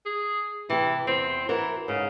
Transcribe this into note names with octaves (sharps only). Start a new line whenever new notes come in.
G#4
C3 E3 G4
E2 C4
E3 E4 F#4 A#4
G#2 C#3